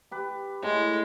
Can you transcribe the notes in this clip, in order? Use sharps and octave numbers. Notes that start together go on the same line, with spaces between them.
G4 B4
A2 G#3